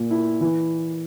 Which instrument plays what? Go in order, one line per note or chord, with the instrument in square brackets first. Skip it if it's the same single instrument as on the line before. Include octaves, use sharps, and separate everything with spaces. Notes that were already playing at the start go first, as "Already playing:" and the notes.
Already playing: [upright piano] A#2 A#3
E4
E3